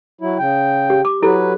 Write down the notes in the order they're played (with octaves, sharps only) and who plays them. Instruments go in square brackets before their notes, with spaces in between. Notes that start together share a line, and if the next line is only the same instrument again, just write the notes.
[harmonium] F#3 E4
C#3 G5
[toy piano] G4
D6
[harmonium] F#3 B4 [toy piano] E4 G4 A4